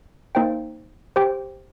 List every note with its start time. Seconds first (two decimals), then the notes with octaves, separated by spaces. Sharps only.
0.35 A#3 D#4 C5 G5
1.16 G4 C5 G5